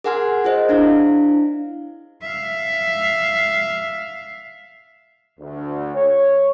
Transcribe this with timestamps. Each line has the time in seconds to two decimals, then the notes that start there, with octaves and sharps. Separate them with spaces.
0.04 G#4 A#4 F#5 G#5 C6 F6
0.45 F4 G#4 C5 D#5
0.69 D4 E4 F5
2.22 E5 F5
5.39 D2
5.94 C#5